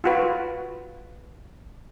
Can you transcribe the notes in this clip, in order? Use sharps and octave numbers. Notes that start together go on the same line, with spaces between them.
F4 F#4 B4